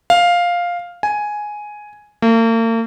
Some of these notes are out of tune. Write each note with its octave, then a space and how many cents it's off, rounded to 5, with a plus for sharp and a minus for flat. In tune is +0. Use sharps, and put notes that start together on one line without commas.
F5 +5
G#5 +5
A#3 -45